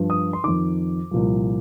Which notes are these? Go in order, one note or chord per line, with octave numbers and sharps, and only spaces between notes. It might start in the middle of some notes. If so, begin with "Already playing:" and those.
Already playing: G2 F3
D#6
C6
F2 D#3 D6
C2 A#2 F3